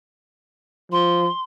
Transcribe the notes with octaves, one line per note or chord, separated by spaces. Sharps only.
F3 C6